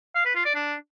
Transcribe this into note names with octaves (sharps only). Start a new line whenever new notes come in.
F5
B4
F4
D5
D4